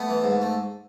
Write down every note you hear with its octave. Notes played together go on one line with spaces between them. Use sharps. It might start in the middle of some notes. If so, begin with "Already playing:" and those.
Already playing: A3 B3
E3
G#2
A3